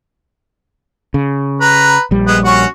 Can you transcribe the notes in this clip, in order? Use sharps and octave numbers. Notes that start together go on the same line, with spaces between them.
C#3
B4 A#5
A#1 G3
G#3 B3
C#4 F#4 C#6